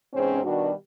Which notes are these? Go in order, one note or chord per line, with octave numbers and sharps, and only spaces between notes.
E2 G#2 C3 C4 C#4
B2 D#3 G3 D4 F#4